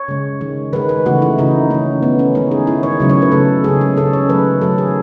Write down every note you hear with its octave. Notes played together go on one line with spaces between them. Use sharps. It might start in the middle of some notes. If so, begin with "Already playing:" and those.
Already playing: C#5
C#3 G#3
D#3 G#3
D#3 G#3 B4
B4
C#3 E3 A3 F#4
E4
C#3 E3 A3 D#4
D#3 A3 C#4
D#3 A3 B3
C#4
D#3 G#3 D#4
G#4
D#3 G#3 E4
C#5
C#3 F#3 A3
C#5
B4
C#3 F#3 A3 A4
C#3 G#3 G#4
C#4
C#3 G#3 A4
C#5
D#3 F#3 A3 B4
D#3 F#3 A3 A4
G#4